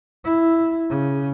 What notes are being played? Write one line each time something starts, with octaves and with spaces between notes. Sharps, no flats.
E4
C#3